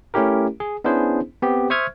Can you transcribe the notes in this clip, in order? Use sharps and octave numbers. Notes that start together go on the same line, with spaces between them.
A3 C#4 E4 G4 A#4
G#4
B3 C#4 D4 E4 G#4 C5
B3 C4 G4
C5 E5 C#6 D#6 F6 G#6